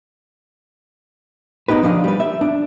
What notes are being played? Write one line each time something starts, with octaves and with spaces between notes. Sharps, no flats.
B3 C#4 D#4 G4 B4
D2 F3 D4 B4 D#5 F5
G3 B4
E5
D4